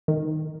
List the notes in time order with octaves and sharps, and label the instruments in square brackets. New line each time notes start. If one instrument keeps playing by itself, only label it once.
[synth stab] D#3